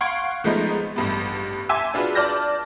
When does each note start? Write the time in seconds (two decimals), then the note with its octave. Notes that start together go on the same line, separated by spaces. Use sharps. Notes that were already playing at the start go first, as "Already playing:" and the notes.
0.01 F5 F#5 C6 C#6 G#6 D7
0.44 F3 G#3 A3 B3 D#4
0.96 A1 G2 B3
1.69 E5 G#5 A5 C6 D6 E6
1.94 D4 F4 F#4 G#4 B4
2.15 D5 A5 F6 G6 A#6